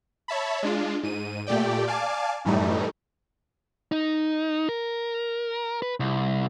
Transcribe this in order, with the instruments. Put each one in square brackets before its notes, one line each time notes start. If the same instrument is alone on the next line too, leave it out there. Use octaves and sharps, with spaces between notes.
[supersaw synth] C#5 E5 A5 B5
G#3 D4 F4
G#2 D#7
A#2 A3 G4 D5 G5
D5 F5 G#5 A5 D6
F#2 A2 E3 G3 A3 D#4
[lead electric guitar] D#4
A#4
B4
C2